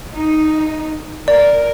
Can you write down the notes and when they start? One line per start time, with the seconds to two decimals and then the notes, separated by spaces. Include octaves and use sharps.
0.12 D#4
1.28 A#4 D5